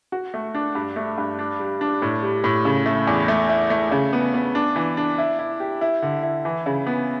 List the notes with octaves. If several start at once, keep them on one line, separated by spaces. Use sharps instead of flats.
F#4
A3
D4
G2
A3
G2
D4
G3
D4
A2
G3
A2
C#3
A3
E2
A3
E4
A3
C#3
B3
B3
D4
E3
D4
E4
E4
G4
E4
D3
E4
E3
C#3
B3